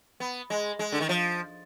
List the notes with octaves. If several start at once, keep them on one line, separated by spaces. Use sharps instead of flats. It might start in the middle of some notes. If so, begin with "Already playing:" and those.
B3
G#3
G#3
D3
D#3
F3